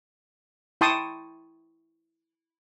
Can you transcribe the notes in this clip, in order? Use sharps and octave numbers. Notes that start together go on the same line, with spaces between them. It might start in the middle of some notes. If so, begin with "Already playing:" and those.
E4 G5 A5 C6 C#6 D#6